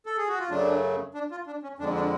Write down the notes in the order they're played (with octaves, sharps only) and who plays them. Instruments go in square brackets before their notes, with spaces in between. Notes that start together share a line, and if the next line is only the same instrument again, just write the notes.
[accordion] A4
G#4
F#4
F4
F#2 C#3 F#3 A3 D4
D4
F4
D4
C#4
F2 D3 G#3 D4
D4